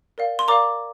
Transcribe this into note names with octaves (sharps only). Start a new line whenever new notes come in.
A#4 D5 F5
C6
A#4 D5 F5 A#5 D6